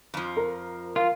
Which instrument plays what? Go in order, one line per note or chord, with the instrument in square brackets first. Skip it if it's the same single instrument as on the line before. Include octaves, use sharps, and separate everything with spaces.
[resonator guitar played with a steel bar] F2 F3
[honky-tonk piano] A#4
[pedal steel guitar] F4 [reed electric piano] A#4 F5